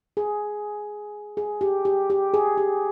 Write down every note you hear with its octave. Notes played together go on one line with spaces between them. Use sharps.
G#4
G#4
G4
G4
G4
G#4
G4